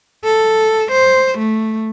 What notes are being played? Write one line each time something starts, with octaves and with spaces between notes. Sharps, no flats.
A4
C5
A3